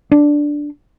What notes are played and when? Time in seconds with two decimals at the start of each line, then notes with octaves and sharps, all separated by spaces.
0.12 D4